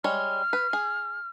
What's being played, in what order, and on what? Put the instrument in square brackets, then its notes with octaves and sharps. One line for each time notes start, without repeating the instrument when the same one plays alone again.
[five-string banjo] G3 G#3 C#5 [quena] F6
[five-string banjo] B4
G#4